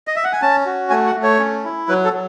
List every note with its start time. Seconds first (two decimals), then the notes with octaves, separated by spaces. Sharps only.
0.07 D#5
0.16 E5
0.24 F#5
0.33 G#5
0.42 C#4 A5
0.66 F#4
0.90 A3 G#5
1.07 F#5
1.15 A3
1.23 C#5
1.39 C#4
1.64 E4
1.88 F#3 B4
2.05 A4
2.13 F#3